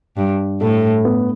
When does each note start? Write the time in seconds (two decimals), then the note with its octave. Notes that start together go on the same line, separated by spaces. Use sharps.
0.17 G2
0.61 A2 A4
1.05 B3